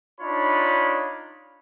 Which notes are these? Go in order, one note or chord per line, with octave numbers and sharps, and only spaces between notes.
D4 D#4 F4 C#5 B5